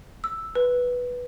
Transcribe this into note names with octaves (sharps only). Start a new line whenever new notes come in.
E6
B4